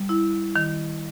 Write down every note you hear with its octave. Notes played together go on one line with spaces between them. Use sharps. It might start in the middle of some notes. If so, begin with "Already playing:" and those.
Already playing: G3
E4
D#3